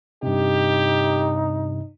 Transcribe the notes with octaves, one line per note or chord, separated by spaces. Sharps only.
G2 C3 D#4 G4